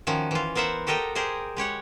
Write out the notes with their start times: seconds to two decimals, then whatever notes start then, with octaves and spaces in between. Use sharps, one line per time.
0.07 D#3 F3 C#4 F#4
0.31 E3 F4
0.55 B3 A#4 C5 E5 F#5
0.87 F#4 G4 A4 A#4 D#5 G5
1.15 G4 G#4 A#4 C5 D#5
1.57 G#3 G4 C#5 F#5